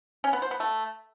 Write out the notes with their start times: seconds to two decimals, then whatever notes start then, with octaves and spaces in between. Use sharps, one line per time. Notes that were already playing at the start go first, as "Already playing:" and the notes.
0.24 C#4
0.33 B3
0.42 C5
0.51 B3
0.60 A3